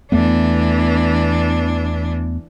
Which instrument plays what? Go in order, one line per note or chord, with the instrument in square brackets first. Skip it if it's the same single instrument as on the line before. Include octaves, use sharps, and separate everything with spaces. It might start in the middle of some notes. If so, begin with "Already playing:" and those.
[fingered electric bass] E2 A3 B3 [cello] E3 D4